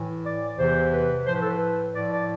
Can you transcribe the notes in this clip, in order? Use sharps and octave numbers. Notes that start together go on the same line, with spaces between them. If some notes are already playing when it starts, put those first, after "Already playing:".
Already playing: A2 E3
D5
E2 C3 E3 C5
B4
A2 F3 C5
B4
A4
B4
A2 F3 D5
D5